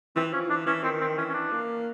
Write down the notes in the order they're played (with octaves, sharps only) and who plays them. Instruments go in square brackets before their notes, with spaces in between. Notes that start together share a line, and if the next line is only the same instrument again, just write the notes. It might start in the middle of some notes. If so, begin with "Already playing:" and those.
[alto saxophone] E3 [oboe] C4
[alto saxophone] F3 [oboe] C#4
[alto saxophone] E3 [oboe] D4
[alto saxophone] E3 [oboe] C#4
[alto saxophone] D#3 [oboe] C4
[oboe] C4
[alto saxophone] E3 [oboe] C#4
[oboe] C#4
D4
[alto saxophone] A#3